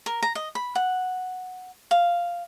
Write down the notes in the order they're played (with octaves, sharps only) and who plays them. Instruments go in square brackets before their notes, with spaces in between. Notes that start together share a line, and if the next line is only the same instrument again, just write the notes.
[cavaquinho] A#4
A#5
D#5
B5
F#5
F5